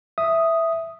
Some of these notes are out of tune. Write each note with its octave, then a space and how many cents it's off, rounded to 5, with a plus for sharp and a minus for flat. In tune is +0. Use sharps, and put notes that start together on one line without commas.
E5 +0 D#6 +0